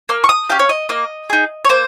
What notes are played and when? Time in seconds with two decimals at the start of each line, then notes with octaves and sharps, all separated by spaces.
0.09 A#3 F6
0.24 C#6
0.29 D#6
0.49 C#4 G4 F5
0.59 C#5
0.69 D#5
0.89 A#3 D#5
1.30 D#4 G#4
1.65 C#5
1.69 A#3 C5